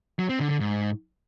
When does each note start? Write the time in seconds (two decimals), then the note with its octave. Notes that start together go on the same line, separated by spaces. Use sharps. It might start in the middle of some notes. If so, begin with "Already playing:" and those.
0.19 F#3
0.29 C4
0.40 D3
0.50 D3
0.60 G#2